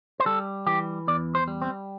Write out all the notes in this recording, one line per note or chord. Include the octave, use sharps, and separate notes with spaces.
C5
G3 A4
E3 G4
E2 D5
C5
G3
C4